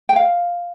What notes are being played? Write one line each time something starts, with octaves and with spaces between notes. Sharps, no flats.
G5
F5